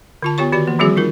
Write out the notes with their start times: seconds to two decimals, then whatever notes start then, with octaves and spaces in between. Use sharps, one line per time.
0.22 D3 F4 A5
0.38 B3 F4 G4 C#5 C#6
0.52 D#3 F#4 G4 D5
0.67 E3 A#3
0.79 D#3 F3 G3 C4 F#4 G#4
0.96 D#4 F4 A#4